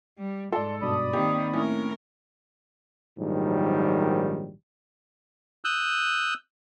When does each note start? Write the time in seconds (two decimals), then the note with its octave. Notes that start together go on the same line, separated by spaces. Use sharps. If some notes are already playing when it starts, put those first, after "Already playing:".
0.18 G3
0.52 G#2 A4 D5 C6
0.82 G2 B2 D5 B5 D#6
1.13 D#3 A#3 C4 G4
1.53 A2 A3 C#4 A#4
3.18 A#1 G#2 D#3 F#3 G3
5.65 D#6 E6 F#6 G6